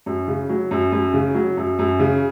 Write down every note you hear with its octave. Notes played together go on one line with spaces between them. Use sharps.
F#2
C#3
F#3
F#2
F#2
C#3
F#3
F#2
F#2
C#3